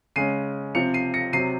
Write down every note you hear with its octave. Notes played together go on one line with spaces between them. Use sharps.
C#3 G#3 C#4 C7 D#7
C3 F3 C4 C#7 F7
C7 D#7
A#6 C#7
C3 F#3 C4 C7 D#7